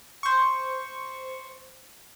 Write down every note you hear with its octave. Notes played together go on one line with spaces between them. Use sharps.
C5 C#6